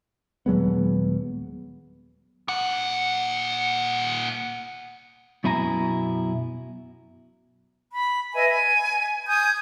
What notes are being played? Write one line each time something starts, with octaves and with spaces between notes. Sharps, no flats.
D#1 F#3 G#3 B3
A#2 F#5
F#2 B2 E4 G#5 A#5
B5
B4 D#5 E5 G#5
G#5
G#5 D#6 G6 G#6